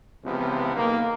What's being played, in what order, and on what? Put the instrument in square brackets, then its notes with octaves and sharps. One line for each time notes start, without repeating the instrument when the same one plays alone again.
[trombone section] C#2 C3 E3 F3 B3
B1 D#3 A#3